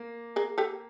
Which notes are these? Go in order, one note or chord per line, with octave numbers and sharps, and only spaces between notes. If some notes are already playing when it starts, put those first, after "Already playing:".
Already playing: A#3
G#4 A#4
G4 A4